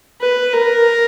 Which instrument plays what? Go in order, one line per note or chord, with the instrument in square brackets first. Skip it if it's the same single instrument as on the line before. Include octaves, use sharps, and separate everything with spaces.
[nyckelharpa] B4
A#4